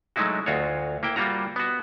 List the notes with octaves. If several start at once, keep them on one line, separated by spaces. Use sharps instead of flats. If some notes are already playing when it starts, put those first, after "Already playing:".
F#3 G#3 A3 D#4 E4 F#4
D2 F4 F#4 C#5
A#3 E4 G5
G3 A#3 F4 F#4 A#5
B3 F#4